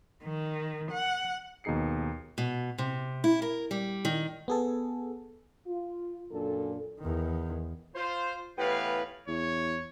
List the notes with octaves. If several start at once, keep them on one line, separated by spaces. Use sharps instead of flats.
D#3
F#5
D#2 B2 D#4 G#4 C7 C#7
B2
C3
E4
A#4
G3
D#3
B3 G#4 A4
F4
F#2 A#2 D4 A4
E2 D#3
F4 C5
A2 E3 B3 G4 B4 F5
E2 C#5